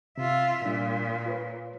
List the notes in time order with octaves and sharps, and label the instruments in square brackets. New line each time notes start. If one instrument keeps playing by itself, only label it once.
[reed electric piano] C3 [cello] F4 E5
[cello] A#2 [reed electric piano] G3 D4
[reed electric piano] F4 B4 C#5